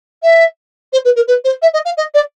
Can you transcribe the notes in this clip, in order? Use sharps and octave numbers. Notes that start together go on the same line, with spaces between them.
E5
C5
B4
A#4
B4
C5
E5
D#5
F5
D#5
D5